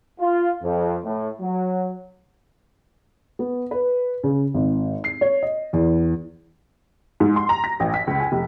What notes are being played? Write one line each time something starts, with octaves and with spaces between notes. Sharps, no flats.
F4
F2
A2
F#3
B3
B4
C#3
G#1
C7
C#5
D#5
E2
G#2
C6
A#5
A#6
A1
B6
C#2
G#5
F1